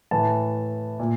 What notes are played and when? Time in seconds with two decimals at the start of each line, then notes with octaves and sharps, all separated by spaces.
0.11 A2 E3 A5
0.99 A#2